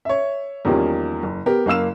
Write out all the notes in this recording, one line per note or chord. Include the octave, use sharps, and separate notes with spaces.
C#5 E5
E2 D#3 F3 G3 A#3 C#4
F#1
B3 G4 A#4
F#1 A#3 F5 E6 E7